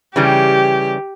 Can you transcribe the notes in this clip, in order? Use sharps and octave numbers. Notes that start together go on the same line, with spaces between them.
C#3 E3 G3 G4